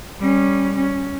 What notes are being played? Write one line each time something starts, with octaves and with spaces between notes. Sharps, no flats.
G3 C#4
C#4